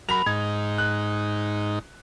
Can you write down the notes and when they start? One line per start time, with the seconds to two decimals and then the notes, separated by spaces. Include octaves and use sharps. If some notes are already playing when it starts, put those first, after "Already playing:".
0.09 F#3 A#4 B5 F7
0.26 G#2 D#4 G#6
0.78 F#6